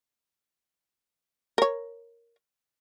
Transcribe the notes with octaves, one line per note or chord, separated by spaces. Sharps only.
A#4 C#5